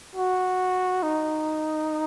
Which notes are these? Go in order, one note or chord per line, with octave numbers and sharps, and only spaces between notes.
F#4
D#4